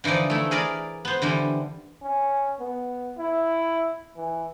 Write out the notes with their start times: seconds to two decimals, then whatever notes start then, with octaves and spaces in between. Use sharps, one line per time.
0.04 D3 E3 F3 D#4 D5
0.30 A3 E4
0.51 G#4 A#4 D5 B5
1.05 B3 C5
1.22 D3 E3 G3
2.02 C#4
2.60 B3
3.18 E4
4.17 E3